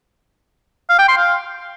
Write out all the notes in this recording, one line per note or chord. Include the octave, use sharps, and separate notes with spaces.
F5
G5
C6
F5